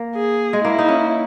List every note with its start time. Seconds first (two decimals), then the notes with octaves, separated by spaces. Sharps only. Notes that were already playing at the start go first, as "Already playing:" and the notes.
Already playing: A#3
0.16 G#4
0.53 G#3
0.64 A#3 E4
0.79 D#4
0.89 C#4